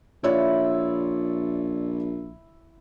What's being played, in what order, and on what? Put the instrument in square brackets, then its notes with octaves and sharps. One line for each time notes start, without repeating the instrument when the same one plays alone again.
[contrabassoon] A#1 [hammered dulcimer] E4 [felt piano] F4 C#5 D5